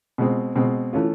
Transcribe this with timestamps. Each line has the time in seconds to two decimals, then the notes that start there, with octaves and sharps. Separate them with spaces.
0.18 B2 G#3 C4
0.56 B2 G#3 C4
0.93 E3 A3 C#4 F4